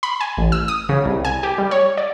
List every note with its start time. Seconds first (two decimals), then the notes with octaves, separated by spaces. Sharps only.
0.03 B5
0.20 G#5
0.38 A1
0.52 E6
0.68 D#6
0.89 C#3
1.05 C2
1.25 G#5
1.43 G4
1.58 G3
1.71 C#5
1.97 D5